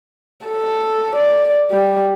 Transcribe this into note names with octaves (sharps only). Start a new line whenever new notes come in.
A4
D5
G3